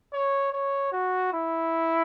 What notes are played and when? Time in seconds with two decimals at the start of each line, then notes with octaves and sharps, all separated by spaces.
0.13 C#5
0.53 C#5
0.92 F#4
1.33 E4